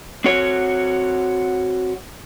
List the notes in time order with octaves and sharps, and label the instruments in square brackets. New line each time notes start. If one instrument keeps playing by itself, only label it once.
[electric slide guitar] C4 F#4 C#5